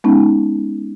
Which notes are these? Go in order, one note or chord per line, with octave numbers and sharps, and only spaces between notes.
G#3 B3 C#4 D#4